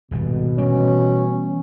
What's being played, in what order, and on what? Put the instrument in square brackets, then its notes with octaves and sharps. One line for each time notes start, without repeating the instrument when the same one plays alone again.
[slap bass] D#1 G#1 G3 [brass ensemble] B2
[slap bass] E3 G3 [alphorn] C#4